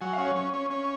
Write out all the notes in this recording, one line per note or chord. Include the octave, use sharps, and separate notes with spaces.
F#3 G#5
C#4 F5
C#5
C#4
C#4
C#4